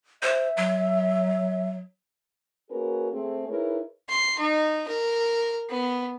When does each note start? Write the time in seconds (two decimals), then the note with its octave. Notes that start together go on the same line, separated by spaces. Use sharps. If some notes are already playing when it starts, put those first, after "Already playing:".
0.22 C5 E5
0.57 F#3
2.70 A#3 C#4 F#4 G#4 A#4 B4
3.12 A3 C4 G#4
3.49 D#4 E4 G#4 A#4 B4 C#5
4.09 C6
4.39 D#4
4.88 A#4
5.70 B3